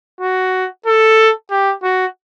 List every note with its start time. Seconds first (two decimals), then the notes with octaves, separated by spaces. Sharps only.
0.21 F#4
0.86 A4
1.51 G4
1.83 F#4